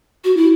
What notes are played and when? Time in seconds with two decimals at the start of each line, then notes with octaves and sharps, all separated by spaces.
0.24 F#4
0.37 E4